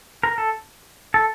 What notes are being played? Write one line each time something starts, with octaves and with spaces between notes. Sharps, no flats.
A#4
A4
A4